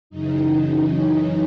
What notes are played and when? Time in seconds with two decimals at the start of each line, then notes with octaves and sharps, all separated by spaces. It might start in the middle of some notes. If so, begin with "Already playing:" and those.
0.10 F#2 C#3 E3 D#4
0.86 C#4